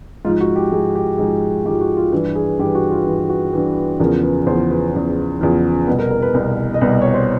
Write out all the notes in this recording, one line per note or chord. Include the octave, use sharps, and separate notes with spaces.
G#2 F3 F4
F#4
G4
G#2 F3 G#4
G4
G#2 F3 G#4
G#2 F3 G4
F#4
F4
G2 E3
G#4
G2 E3 G4
F#4
F4
G2 E3 F4
F#4
G2 E3
E2 C#3 F3 A#4
B4
E2 C#3 F3 C5
B4
E2 C#3 F3
E2 C#3 F3
C2 B2 B4
A#4
A#4
B4
C2 B2
D#5
C2 B2
D5
C#5
C5